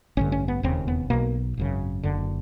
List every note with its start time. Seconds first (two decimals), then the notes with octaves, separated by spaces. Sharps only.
0.17 A1 G2 D3 C#4
0.32 C#4
0.48 B3
0.63 E1 D#2 C#3 C4
0.88 B3
1.10 B1 B2 A#3
1.57 G#1 F#2 C#3
2.03 F#1 F#2 D3